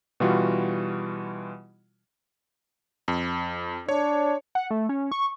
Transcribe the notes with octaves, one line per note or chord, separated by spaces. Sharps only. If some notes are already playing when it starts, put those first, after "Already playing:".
B2 E3 G3 F4 F#4
F2
D4 C#5
F#5
A3
C#4
C#6